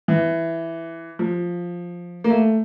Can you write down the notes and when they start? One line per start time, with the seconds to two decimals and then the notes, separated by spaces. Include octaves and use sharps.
0.08 E3
1.19 F3
2.24 A#3
2.30 A3